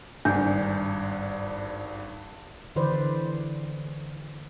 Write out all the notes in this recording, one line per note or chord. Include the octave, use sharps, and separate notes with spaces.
G#1 G2 D4
D3 E3 B4 C5 D5